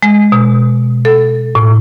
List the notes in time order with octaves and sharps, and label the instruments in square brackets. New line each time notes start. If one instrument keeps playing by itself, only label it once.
[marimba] G#3
B2
A4
A2